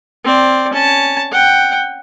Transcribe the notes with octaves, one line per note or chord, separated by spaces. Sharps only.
C4 D5
C#4 A5
F#5 G5